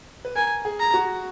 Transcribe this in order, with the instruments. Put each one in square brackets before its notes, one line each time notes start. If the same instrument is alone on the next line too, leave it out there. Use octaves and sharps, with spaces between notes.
[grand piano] B4
[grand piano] A#4 [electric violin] G#5
[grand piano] G#4
[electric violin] A#5
[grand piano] F#4